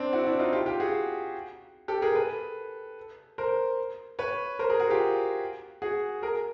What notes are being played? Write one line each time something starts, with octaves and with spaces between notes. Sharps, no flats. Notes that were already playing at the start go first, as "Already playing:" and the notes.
Already playing: C4 D4
E4 F#4
D4 E4
D#4 F4
F4 G4
F4 G4
F#4 G#4
G4 A4
G#4 A#4
A4 B4
A#4 C5
B4 C#5
A#4 C5
G#4 A#4
F#4 G#4
F4 G4
F#4 G#4
G#4 A#4